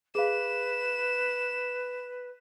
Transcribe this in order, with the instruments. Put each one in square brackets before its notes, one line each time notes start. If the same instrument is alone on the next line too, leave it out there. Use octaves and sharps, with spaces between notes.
[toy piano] G#4 F5 [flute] B4 [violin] E7